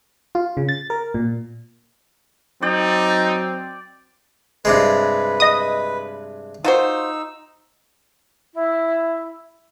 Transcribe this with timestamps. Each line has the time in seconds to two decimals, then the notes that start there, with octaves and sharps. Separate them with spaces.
0.35 F4
0.57 C#3
0.69 A6
0.90 A#4
1.14 A#2
2.62 F#3 C4 D#4 D5 G5
4.65 G2 C3 G#3 B4
5.40 D#5 D#6
6.64 D#4 F4 F#4 C5 E6
8.54 E4